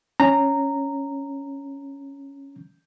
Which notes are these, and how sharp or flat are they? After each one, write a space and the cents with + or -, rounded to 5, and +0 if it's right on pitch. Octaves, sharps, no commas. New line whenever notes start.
C#4 +0 A#5 -10